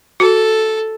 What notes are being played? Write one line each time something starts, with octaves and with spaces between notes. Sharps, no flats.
F#4 A4